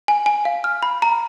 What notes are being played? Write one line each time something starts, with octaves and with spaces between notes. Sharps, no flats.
G#5
G#5
F5
F6
B5
A#5